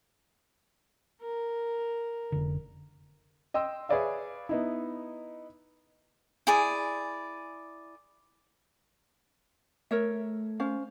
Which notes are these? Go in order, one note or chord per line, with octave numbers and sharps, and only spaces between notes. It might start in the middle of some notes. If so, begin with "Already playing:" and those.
A#4
F1 D3
D#5 G5 C6 E6
G#4 B4 C#5 D5 E5 F5
B3 D#4 E4
E4 G#4 D5
A3 A#4 C#5 E5
C#4 C5 F5